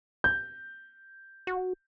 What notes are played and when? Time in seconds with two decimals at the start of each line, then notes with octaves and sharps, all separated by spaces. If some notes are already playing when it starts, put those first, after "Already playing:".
0.24 G6
1.47 F#4